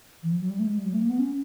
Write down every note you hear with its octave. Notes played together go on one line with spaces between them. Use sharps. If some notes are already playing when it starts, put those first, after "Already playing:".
E3
F3
F#3
G3
A3
G#3
G3
F#3
A3
A#3
B3
C#4